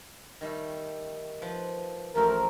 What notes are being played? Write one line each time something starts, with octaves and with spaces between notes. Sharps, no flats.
D#3 G3 A3
F3 B4
A1 A2 F3 A3 C4 A#4